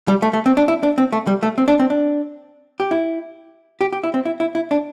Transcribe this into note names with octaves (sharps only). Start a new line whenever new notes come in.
G3
A3
A3
C4
D4
E4
D4
C4
A3
G3
A3
C4
D4
C4
D4
G4
E4
G4
G4
E4
C4
E4
E4
E4
D4